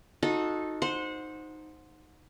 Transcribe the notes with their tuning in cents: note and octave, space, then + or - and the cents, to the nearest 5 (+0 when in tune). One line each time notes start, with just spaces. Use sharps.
D#4 +0 F#4 -35 A4 -5
C5 +0 F#5 -25 C6 +0